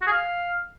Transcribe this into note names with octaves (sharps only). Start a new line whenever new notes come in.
F#4
G#4
F5